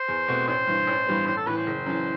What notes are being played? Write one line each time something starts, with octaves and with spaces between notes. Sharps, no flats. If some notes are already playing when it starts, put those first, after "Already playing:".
Already playing: C5
E2
B2 A3 C4 F#4
A1 C5
G2 E3
A1
G2 E3 G3 B3
A1 C5
A4
A2 E3 B4
C5
F#1
F#2 E3